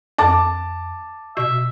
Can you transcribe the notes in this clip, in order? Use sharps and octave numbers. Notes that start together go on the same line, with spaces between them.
F2 A5 D6 A6
B2 E5